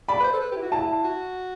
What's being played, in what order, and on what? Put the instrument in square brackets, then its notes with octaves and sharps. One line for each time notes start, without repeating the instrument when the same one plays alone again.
[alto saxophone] D5 [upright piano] B5
[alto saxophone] B4
C5
A4
B4
G4
E4
F#4
[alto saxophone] E4 [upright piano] A5
[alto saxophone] F#4